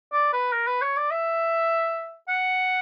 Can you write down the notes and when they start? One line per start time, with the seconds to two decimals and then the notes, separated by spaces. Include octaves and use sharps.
0.13 D5
0.33 B4
0.52 A#4
0.67 B4
0.82 C#5
0.97 D5
1.11 E5
2.29 F#5